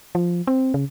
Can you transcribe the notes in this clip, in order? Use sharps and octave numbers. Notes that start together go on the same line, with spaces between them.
F3
C4
C#3